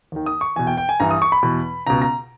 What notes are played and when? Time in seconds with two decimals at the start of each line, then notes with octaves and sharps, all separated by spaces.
0.12 D#2 D#3
0.26 D#6
0.41 C#6
0.56 E2 B2 G#5
0.67 G5
0.77 G5
0.89 G#5
1.00 G2 E3 A#5
1.11 D#6
1.22 C#6
1.32 B5
1.43 E2 B2
1.87 C#2 B2 A#5
2.02 A#5